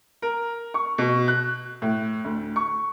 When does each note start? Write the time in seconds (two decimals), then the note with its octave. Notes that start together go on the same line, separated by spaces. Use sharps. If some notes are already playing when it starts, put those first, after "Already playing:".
0.22 A#4
0.74 C#6
0.98 B2
1.28 F#6
1.82 A2
2.24 D2
2.56 C#6